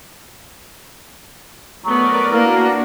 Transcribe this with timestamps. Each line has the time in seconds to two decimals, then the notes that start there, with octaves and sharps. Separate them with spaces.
1.85 F#3 A3 B3 A#4 B4 D5
2.31 A#3 D4 E4 F#4 A#4